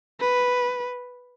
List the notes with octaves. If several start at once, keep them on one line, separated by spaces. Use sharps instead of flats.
B4